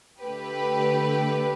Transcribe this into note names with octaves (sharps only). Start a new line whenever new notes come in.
D3 A3 G4 B4